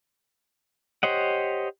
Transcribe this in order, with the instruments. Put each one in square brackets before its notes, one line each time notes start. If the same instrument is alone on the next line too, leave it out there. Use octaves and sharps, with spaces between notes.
[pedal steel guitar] G4 C5 C#5 D#5 F#5